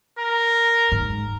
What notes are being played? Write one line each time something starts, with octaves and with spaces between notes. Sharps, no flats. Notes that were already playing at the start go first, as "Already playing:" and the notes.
A#4
G#2